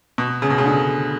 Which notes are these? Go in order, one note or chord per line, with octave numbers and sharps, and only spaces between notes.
B2
C#3
B2
C#3
D3